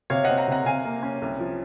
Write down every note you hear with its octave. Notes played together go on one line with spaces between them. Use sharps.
C3 C#5 F5
D#5 F#5
C4
F#5 A#5
C3 F#5 A#5
C3 F5 G#5
A#3
C#4
C2
F3